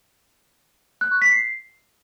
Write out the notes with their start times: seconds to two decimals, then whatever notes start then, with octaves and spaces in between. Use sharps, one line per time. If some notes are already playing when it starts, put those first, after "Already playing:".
1.01 F#6
1.11 C#6
1.22 B6
1.32 C7